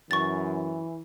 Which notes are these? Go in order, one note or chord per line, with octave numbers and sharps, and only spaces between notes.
F#2 E3 C#6 A6